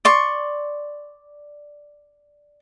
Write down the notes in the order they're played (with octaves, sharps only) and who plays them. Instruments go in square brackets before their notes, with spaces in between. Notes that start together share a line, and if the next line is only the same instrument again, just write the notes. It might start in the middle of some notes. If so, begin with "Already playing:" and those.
[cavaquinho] D5 C6 C#6